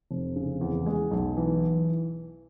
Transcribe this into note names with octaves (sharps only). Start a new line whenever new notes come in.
F1
C#3
E2
G#3
B1
E3